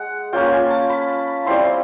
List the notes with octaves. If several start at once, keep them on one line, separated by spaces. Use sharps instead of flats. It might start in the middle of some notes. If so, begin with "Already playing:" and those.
Already playing: G#3 F#5
A#3 C#4 F4 G5
G#5
A5
B5
G3 C4 E4 C6